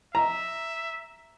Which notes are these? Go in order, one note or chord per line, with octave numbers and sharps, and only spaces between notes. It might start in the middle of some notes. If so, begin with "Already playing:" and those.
E5 A#5